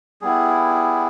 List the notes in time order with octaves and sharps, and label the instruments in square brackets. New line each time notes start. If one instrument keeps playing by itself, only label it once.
[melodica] G3 B3 E4 G#4